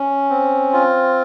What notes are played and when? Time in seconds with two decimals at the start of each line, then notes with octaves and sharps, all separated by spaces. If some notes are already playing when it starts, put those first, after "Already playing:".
Already playing: C#4
0.30 C4
0.73 F4